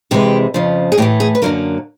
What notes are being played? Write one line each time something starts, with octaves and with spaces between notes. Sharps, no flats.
F2 C3 E3 G#3 G4
F2 C#3 F3
G#4
A2 E3 A3 G4
G#4
B4
F#2 D3 F#3 A#3 A#4